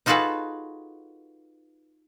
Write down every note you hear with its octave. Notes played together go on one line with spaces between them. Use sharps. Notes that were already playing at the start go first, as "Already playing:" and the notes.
D#4 F4 F#4 G#4 A4 B4